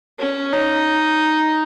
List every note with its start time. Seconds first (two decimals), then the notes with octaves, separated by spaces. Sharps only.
0.19 C#4
0.53 D#4